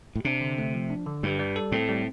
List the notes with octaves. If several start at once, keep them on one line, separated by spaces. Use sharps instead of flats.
A2
C3 D4
D3
A3
F3
D4
D3
G2 G3
G3
A4
A2 C4
G3